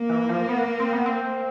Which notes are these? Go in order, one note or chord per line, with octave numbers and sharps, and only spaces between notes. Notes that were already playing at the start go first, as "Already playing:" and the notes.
Already playing: A#3
E3
F3
B3
C4
B3
C4